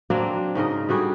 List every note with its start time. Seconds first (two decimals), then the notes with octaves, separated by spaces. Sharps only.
0.10 F#3 A#3 C4 D4
0.55 G#2 C#3 A#4 D#5
0.89 D3 G3 F#4 G#4